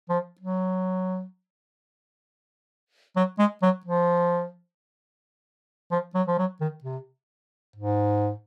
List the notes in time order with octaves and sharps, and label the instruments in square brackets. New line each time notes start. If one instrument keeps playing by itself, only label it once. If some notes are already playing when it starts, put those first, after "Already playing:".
[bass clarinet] F3
F#3
F#3
G#3
F#3
F3
F3
F#3
F3
F#3
D#3
C3
G#2